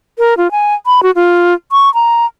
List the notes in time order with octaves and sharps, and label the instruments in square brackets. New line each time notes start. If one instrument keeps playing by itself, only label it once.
[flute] A#4
F4
G#5
B5
F#4
F4
C#6
A#5